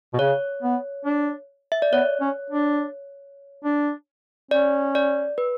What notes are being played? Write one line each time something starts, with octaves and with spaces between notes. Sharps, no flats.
B2
C#3 C#5
B3
D4
E5
D5
B3 C#5
C#4
D4
D4
C#4 D5
D5
B4